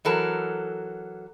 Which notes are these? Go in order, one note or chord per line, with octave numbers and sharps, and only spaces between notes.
E3 F#3 A4 A#4